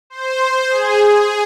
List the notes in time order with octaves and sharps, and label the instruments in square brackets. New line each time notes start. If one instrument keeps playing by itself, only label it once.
[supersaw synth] C5
G#4
G#4